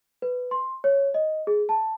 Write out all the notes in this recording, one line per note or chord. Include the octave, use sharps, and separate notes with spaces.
B4
C6
C#5
D#5
G#4
A5